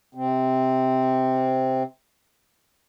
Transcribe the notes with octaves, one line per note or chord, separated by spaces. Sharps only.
C3 C4